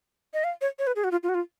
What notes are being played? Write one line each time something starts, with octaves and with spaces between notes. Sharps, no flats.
D#5
F5
C#5
C#5
B4
G#4
F#4
F4
F4
F#4
F4